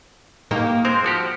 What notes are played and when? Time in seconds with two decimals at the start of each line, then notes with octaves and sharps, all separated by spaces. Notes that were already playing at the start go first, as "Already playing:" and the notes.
0.51 D#3 A#3 D#4 G4
0.85 G#3 C4 A#4 C5
1.04 F3 F#4 G4